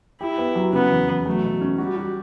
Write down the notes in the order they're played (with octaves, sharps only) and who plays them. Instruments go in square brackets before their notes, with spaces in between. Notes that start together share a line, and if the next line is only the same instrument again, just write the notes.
[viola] E4 [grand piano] G4
[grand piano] B3
F#3
[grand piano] C#3 [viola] B3
[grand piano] E2
E2
[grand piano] F#3 [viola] A3
[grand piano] B2
C#4
[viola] G3 [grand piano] F#4
[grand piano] F#4